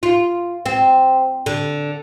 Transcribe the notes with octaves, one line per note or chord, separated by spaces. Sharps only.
F4
C4
D3